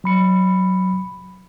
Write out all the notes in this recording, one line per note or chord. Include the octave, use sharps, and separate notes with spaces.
F#3 B5 C#7